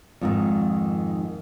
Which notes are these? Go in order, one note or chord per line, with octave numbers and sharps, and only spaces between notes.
F2 G#2 D#3